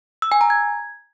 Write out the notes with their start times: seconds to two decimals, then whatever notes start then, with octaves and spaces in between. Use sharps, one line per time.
0.22 E6
0.32 G#5
0.41 A#5
0.50 G#6